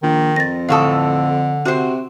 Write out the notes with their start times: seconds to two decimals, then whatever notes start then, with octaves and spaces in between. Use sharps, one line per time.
0.03 A#1 D#3
0.36 F2 A6 A#6
0.69 A2 D3 E3 A4 F5 C#6 D#6
1.65 C3 F#4 C5